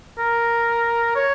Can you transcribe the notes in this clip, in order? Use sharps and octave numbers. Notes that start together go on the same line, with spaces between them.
A#4
C#5